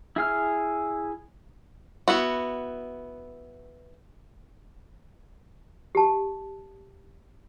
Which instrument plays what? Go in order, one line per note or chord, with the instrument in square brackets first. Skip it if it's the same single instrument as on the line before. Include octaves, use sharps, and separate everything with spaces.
[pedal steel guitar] E4 G#4 F6
[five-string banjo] B3 E4 F#4
[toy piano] G4 A5